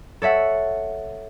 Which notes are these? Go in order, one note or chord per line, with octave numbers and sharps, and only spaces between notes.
A4 C#5 E5 F#5